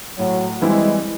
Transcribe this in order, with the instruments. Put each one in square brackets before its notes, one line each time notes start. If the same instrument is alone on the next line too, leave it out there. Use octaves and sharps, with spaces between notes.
[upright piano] A2 [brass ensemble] F#3
[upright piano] E3 G3 C4 E4 [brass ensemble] G#3